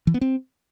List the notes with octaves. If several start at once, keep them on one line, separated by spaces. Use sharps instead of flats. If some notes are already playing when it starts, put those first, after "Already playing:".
E3
B3
C4